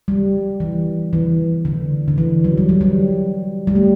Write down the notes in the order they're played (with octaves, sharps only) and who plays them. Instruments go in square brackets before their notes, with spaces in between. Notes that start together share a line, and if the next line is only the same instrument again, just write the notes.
[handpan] G3
E3
E3
D3
D3
E3
F#3
G3
F#3
G3
G3
A3